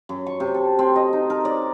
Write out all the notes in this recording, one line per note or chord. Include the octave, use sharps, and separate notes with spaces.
F#2
C#6
C3
A4
C4
D#5
D#4
A#4
D5